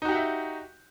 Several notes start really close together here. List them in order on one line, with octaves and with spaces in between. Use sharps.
D#4 F#4 G4 F#5 E5